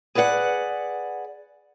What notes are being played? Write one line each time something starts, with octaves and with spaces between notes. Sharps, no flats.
G#4 B4 D5 F5 F#5